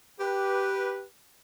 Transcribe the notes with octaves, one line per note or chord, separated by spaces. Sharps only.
G4 B4